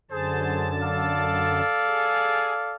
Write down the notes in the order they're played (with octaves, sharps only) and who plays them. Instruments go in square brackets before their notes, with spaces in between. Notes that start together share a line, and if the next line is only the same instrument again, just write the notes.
[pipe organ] F#2 D3 A5 [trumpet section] G#4 C5
[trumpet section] A4 D5 F5
[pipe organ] G#4